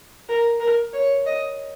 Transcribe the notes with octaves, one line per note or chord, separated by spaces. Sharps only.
A#4
A#4
C#5
D#5